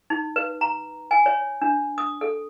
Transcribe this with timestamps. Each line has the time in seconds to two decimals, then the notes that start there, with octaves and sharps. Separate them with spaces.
0.10 D#4
0.36 B4
0.61 A#5
1.11 G#5
1.26 C#5
1.61 D4
1.98 D#6
2.21 A4